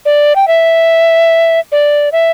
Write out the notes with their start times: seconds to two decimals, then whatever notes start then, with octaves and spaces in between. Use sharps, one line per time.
0.05 D5
0.36 G5
0.48 E5
1.72 D5
2.12 E5